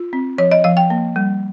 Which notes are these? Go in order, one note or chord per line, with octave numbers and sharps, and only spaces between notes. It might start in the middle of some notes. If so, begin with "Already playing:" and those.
Already playing: F4
C4
F3 C#5
D#5
F3 F5
G5
A#3
G3